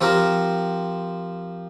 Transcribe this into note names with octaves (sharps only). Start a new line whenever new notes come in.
F3 C4 G4 A#4